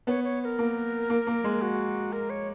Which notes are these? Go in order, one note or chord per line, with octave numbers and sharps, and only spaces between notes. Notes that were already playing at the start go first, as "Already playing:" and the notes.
B3 C#5
C#5
C#5
A#4
A#3
A#3
A#3
G#3
F#4
A#4
C#5